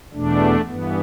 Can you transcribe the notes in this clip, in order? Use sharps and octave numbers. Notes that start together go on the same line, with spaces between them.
E2 B2 A3 D4
G2 E3 B3